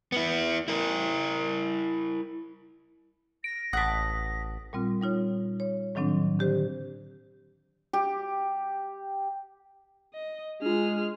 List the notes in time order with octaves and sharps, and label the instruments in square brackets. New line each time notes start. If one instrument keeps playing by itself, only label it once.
[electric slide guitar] B3 E4
E4 A#4
[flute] A#6 [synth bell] D7
[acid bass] A1 [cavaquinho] F#5 A5 [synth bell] D#6 B6
[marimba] A#2 G3 C4 F4
G3 D#4 F4 C#5
C#5
A2 D#3 F#3 C4 D4
D3 G4 C5
[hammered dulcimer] G4
[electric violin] D#5
[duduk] G#3 [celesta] D4 F4 [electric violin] G#4 F6